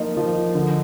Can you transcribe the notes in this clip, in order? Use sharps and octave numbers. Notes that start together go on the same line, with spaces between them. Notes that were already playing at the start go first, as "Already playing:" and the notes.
Already playing: F3 A#3 D#4 D#5
F3
D3